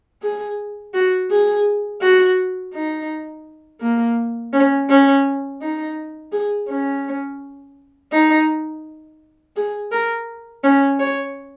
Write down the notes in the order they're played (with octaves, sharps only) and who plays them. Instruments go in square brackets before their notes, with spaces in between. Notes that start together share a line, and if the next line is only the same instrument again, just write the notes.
[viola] G#4
F#4
G#4
F#4
D#4
A#3
C#4
C#4
D#4
G#4
C#4
D#4
G#4
A#4
C#4
C#5